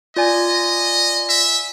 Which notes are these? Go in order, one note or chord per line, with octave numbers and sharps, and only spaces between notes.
F4 D5 D#5 G#5
E5